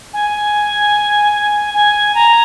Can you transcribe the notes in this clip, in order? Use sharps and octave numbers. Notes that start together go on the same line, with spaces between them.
G#5
G#5
A#5